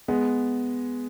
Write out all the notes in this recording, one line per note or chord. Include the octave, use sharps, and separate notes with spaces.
G#3 B3